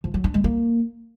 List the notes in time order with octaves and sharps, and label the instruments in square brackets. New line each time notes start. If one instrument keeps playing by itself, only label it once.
[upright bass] F3
F#3
D4
G#3
A#3